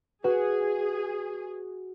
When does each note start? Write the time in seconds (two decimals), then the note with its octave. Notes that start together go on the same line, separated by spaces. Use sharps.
0.24 F#4 G#4 B4